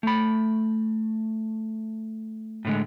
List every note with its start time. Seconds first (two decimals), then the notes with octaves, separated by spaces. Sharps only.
0.03 A3 B5
2.65 A2 D3 G#3